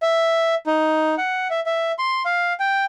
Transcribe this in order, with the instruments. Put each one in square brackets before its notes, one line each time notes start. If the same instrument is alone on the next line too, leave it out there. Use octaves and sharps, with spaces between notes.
[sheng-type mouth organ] E5
D#4
F#5
E5
E5
C6
F5
G5